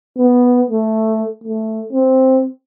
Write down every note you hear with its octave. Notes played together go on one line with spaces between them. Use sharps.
B3
A3
A3
C4